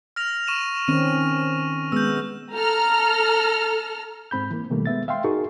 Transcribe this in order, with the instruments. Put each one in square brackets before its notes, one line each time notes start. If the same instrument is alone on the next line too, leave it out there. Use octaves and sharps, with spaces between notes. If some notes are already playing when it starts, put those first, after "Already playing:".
[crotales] F6 A#6 F7
C#6 D#7 E7
[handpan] D#3 C4 C#4 [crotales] D#7
[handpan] G#3 B3 [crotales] E6 G6
[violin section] A4 A#5 F6
[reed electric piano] G#2 C4 B5 G6
E3 A#3
B2 D#3 G3 A3 A#3
G#3 B3 E5 A6
E5 F5 G5 C6
D#4 F#4 G#4 A#4 C#6